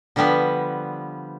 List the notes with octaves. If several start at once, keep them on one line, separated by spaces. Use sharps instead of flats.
D3 F3 G3 B3 B4